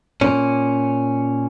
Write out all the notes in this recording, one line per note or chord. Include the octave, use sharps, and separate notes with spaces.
A#2 C#4